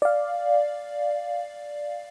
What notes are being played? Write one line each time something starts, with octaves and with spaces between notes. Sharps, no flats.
D5 F5